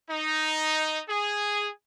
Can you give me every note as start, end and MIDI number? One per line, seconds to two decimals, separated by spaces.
0.10 1.01 63
1.08 1.70 68